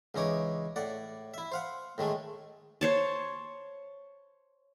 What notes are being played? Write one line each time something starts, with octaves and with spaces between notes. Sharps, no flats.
C#2 E3 D#4 C#5 D6
A2 D5 F#5
E4 E5
C5 F5 F#5
A2 D#3 G#3 A3
C5 C#5 A5